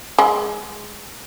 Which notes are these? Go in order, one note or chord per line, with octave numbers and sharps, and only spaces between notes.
G#3